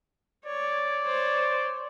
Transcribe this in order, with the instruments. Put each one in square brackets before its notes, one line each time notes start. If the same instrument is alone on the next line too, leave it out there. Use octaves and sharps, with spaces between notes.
[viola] C#5 [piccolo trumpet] D5
[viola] C5 C#5